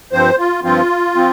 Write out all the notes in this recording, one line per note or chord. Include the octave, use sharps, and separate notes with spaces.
G2 F3 C4 C5
F4
G2 F3 C4 F4
F3 C4